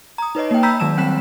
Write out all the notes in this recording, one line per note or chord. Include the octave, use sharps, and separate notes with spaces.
A#5 D#6
D#4 B4 C#5 D#5
A#3 G5
A#5 B5 E6 G6 B6
D#3 F#3 G#3 A5 E6 E7
G3 C4 G5 F#6 B6 E7